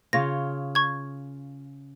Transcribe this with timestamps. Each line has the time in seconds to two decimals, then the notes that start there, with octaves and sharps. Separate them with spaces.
0.13 C#3 F4 C#5 A#6
0.75 C#6 G#6